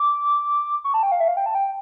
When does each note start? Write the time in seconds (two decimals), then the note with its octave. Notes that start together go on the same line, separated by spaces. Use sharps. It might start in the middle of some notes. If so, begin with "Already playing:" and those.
Already playing: D6
0.84 C#6
0.94 A5
1.03 G5
1.12 F5
1.20 E5
1.28 F5
1.37 G5
1.46 A5
1.55 G5